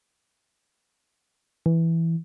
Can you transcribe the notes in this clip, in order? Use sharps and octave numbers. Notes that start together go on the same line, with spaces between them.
E3